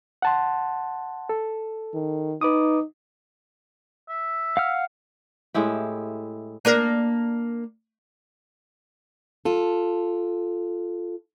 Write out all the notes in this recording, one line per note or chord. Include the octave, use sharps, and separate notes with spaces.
F#5 A5 C6
A4
D#3
D#4 B4 D6 D#6
E5
F5 F#5 F6
A2 G#3 E4 G4
A#3 D4 A#4
F4 A4